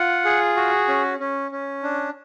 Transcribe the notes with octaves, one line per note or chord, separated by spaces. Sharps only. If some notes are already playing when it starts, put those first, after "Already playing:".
Already playing: F4 F#5
G#4
F#4
C#4
C#4
C#4
D4